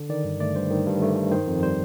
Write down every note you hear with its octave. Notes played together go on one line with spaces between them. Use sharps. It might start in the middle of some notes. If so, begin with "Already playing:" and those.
Already playing: D3
D#3 D5
G2
A3 D5
G2 C5
D#3
G2
A3
G2
D#3 C5
F2
G3 C5